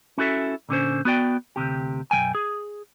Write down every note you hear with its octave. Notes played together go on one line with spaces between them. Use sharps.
C#4 E4 F#4 A4 E5
A#2 D3 C#4 C5
B3 F#4 D5 G5
D2 G#2 C3 G4
B1 F#2 E3 G5 G#5
G#4